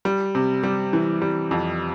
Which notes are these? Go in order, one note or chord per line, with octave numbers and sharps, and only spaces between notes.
G3
C3
G3
E3
G3
F2